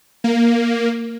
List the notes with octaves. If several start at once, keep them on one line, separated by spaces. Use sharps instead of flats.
A#3